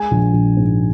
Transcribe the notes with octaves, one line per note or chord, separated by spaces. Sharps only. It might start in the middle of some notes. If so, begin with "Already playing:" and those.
Already playing: G#3 G#5
A#1
A#1
G#2